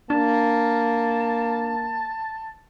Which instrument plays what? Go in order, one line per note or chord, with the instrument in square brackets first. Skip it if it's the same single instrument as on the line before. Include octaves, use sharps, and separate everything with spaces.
[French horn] A#3 [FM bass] D4 [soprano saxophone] A5